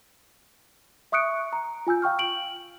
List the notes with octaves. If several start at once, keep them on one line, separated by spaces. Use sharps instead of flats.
E5 C#6 D#6 F#6 C#7 D7
A#5
F4 G#5 E6 G6
F5 G5 C#6 F6
D7 F#7